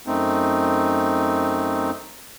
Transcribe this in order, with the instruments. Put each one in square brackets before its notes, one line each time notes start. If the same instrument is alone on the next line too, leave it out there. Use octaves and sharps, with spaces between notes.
[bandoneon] F#2 A3 C4 D#4